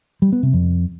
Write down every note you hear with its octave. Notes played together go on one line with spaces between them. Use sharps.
G3
B3
C3
F2